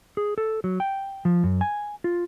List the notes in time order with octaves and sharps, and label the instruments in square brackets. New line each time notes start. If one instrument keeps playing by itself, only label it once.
[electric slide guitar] G#4
A4
F#3
G5
F3
F#2
G#5
F4